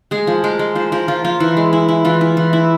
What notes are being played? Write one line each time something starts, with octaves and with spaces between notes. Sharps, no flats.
G#3 G#4
F3
G#3 A#4
G#3
F3 C5
F3 A#4
F3 F4
F3 F4
E3 E4
G#3
E4
E4
E3 F4
E4
E3
E4